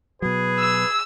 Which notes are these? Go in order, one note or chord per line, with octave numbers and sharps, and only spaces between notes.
B2 F#3 G#4 B4
E6